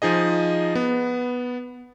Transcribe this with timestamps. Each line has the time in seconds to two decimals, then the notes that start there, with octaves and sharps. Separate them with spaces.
0.02 F3 D#4 G#4 D#5
0.75 B3